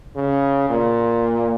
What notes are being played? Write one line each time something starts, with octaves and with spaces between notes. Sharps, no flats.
C#3
A#2